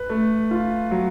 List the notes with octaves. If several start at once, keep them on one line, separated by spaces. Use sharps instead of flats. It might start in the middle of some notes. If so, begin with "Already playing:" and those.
Already playing: B4
A3
F4
F#3